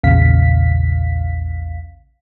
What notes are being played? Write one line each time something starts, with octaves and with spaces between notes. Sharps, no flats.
A#1 E2 A#2 C#3 F5 B6